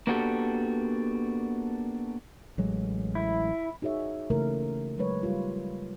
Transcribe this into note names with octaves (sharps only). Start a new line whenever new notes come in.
A#3 B3 D4 F#4 G4 A4
A1 F#3 G#3
E4
D#4 F#4 G#4 C#5 E5
C#3 E3 A3 A#3 A#4
F#3 G#3 B4 C#5
G3 F4